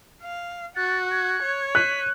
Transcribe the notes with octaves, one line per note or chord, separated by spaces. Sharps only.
F5
F#4 F#6 A6
G#6
C#5
F#6 B6 D#7